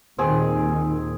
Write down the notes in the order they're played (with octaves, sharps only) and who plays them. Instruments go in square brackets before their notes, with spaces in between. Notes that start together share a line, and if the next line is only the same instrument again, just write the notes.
[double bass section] D#2 A#2 D#3 [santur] C4 G#4